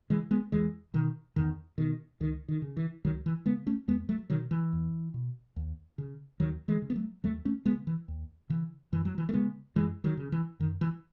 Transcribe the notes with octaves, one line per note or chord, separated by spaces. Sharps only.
C#3 E3 G#3
G#3 B3
E2 E3 G#3
B2 D#3
E2 D#3
B2 D#3
C#2 D#3
D#3
C#3
E3
C#2 D#3 F#3
E3
C#3 G#3 B3
A3 C#4
E2 G#3 B3
F#3 A3
B2 D#3 F#3
E3
E2
B2
D#2
C#3
D#2 D#3 F#3
E3 G#3
C#3
B3
F#3 A3
D#2 F#3 A3
A3 C#4
C#3 G#3 B3
E3
D#2
C#3 E3
F#2 E3
F#3
E3
A3
C#3 G#3 B3
F#2 E3 G#3
D#3 F#3
C#3
E3
F#2 D#3
E3